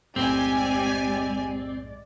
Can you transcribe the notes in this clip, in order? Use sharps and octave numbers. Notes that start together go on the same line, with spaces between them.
B1 F#2 A2 G#3 C4 G4 D5 G#5